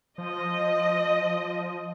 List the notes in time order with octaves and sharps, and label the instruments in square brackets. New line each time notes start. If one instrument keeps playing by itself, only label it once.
[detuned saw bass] F3 [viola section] D#5